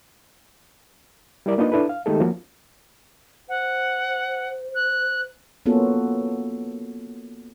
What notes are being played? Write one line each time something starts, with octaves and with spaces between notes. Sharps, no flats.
G3 E4 A#4 D5
A#3 D4 D#4 F4 B4 D#5
D4 E4 A4 B4
F5
D#3 G#3 A3 D#4 G4 A4
F3 A#3 C#4 F#4
C5 F#5
F#6
A#3 B3 C#4 F4 F#4 A4